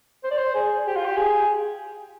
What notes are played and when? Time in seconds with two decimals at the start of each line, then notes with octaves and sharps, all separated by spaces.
0.24 C5
0.31 D5
0.38 C5
0.55 G#4
0.87 G4
0.96 F4
1.05 G4
1.17 G#4